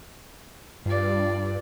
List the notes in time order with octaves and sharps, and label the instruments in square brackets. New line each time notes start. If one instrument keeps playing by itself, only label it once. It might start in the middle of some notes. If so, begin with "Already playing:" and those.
[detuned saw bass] G2 [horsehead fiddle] F4 D5